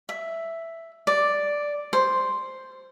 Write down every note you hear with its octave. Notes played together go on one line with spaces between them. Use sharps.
E5
D5
C5